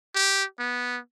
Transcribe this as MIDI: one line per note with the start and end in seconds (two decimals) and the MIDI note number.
0.15 0.44 67
0.59 0.98 59